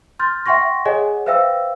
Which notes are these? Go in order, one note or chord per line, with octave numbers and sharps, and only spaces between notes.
C6 F6 G6 A6
E5 F#5 G5 C6 C#6 A#6
G#4 C#5 D#5 F#5 G#5
B4 C5 E5 F5 G5 E6